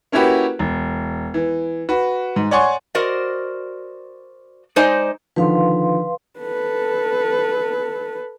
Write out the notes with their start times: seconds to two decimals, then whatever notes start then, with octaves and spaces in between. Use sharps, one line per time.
0.12 A#3 C#4 E4 F#4 G4 B4
0.59 E1
1.34 E3
1.89 F#4 B4
2.36 G#2
2.51 C#5 D5 F#5 G#5 C6 C#6
2.95 F#4 A#4 C5 D5 D#5
4.76 G#3 D#4 C5 D5 D#5 G#5
5.36 D3 D#3 F3 B4 F5 C6
6.40 A4 B4